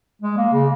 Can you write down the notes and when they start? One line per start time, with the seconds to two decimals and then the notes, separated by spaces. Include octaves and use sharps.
0.22 G#3
0.38 A#3
0.53 C#3